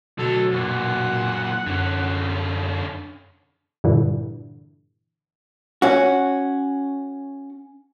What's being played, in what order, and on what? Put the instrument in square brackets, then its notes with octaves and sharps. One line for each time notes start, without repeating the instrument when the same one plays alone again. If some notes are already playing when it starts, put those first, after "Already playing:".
[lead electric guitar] D2 F#3 [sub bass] B2 [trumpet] A4
[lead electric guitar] F#2 A#2 [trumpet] F#5
[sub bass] F#2 [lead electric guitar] D3 C#4
[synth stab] G2 A#2 D3 E3
[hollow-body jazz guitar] C#4 F#4